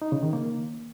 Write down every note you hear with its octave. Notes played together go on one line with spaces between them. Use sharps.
D#4
C#3
D#3
A#3